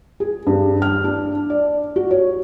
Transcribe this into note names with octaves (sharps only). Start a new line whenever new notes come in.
G#4
G2
F6
D4
D5
F#4
C#5